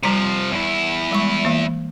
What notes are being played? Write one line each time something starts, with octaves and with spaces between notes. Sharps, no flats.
C3 F3 G3 A#5
E2 E4
G3 G#3 C#6
E3 A#3